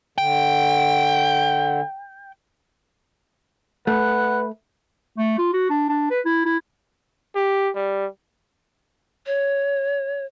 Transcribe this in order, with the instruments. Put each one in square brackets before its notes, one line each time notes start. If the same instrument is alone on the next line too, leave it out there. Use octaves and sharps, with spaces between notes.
[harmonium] D3 [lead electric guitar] G5
[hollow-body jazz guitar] A3 [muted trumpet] B4 [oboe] F#5
[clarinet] A3
F4
F#4
D4
D4
B4
E4
E4
[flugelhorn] G4
G3
[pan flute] C#5